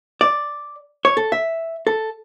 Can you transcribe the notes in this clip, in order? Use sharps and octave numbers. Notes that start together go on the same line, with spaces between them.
D5
C#5
A4
E5
A4